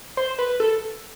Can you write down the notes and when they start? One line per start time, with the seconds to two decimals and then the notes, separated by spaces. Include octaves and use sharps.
0.17 C5
0.39 B4
0.60 A4